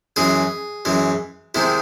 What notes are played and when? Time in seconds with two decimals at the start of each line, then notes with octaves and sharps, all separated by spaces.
0.16 F#2 E3 G#3 G#4
0.85 F#2 E3 G#3
1.55 C3 D#3 G#3 E4